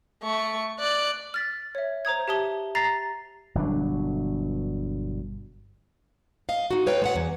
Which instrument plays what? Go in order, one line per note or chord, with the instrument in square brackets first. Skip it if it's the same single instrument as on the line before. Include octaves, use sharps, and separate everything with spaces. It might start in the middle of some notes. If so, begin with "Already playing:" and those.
[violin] A3 C#6
D5 F#6
[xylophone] F6 A6 B6
C#5 E5
C5 A#5 D#6 G#6
G4 E5 A5 D#6 G7
A#5 A6 A#6 C7
[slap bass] G1 B2 F#3 D4
[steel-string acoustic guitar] D#5 F5
D#4 F#4
B4 C#5 F5 G5
G#3 C#5 F#5
E2